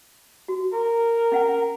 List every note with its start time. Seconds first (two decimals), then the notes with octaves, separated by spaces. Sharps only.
0.48 F#4
0.73 A#4
1.32 C#4 F#5 G5